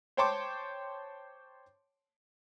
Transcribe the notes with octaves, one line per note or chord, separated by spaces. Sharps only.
C5 C#5 G5 A5 C6 D6